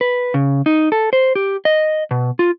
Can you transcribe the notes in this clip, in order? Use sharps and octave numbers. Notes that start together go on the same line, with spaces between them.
B4
C#3
D#4
A4
C5
G4
D#5
B2
F4